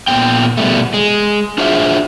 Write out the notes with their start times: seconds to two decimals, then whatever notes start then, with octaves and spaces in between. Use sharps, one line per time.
0.08 A#2 B3 G5
0.57 B2 G3 A3
0.94 G#3
1.58 D4 F4 F#4 G#4 C5 E5